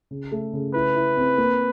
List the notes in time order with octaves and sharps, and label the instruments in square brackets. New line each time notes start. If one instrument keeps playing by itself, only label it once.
[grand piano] C#3
A3
C#3
[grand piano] E4 [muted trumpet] B4
[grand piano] E4
C4
A#3